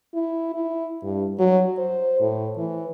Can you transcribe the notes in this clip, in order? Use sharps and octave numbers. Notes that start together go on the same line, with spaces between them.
E4
E4
G2
F#3
C5
A2
E3